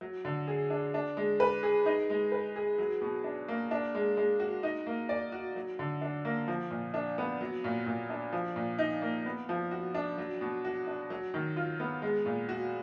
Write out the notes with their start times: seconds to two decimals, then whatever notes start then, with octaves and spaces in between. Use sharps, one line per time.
0.01 F#3
0.25 D3
0.47 G#4
0.70 D4
0.94 D4
1.17 G#3
1.40 B4
1.63 G#4
1.86 D#4
2.10 G#3
2.32 B4
2.56 G#4
2.78 F#3
3.02 B2
3.24 D4
3.48 A#3
3.71 D4
3.95 G#3
4.17 G#3
4.40 F#4
4.63 D#4
4.87 A#3
5.09 D5
5.32 F#4
5.56 F#3
5.79 D3
6.01 D4
6.25 A#3
6.48 F3
6.71 A#2
6.94 D4
7.18 B3
7.41 F#3
7.64 A#2
7.86 A#2
8.10 D4
8.32 F3
8.56 A#2
8.79 D#4
9.02 A#3
9.25 B3
9.49 F3
9.71 F#4
9.95 D4
10.18 F#3
10.41 B2
10.65 F#4
10.87 D4
11.10 F#3
11.34 D#3
11.56 F4
11.80 B3
12.02 G#3
12.26 A#2
12.49 F#4